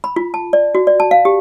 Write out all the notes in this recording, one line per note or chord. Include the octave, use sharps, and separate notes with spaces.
B5
F4
A5
D5
F#4
D5
A5
F5
G4